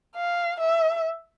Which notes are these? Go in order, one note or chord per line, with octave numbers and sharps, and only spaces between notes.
F5
E5